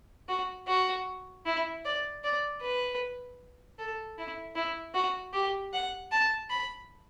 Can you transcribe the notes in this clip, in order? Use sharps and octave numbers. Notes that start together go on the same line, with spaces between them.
F#4
F#4
E4
D5
D5
B4
A4
E4
E4
F#4
G4
F#5
A5
B5